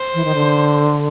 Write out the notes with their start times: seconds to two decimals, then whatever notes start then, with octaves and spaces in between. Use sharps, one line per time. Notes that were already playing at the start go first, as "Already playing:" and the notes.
Already playing: C5
0.14 E3
0.25 D#3
0.35 D3